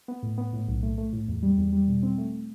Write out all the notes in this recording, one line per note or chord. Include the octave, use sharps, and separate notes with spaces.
B3
A2
B3
A2
B1
A3
A3
A2
E2
G3
E2
G3
B2
C4
A3